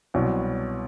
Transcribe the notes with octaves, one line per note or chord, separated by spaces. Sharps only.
C2 B2 F#3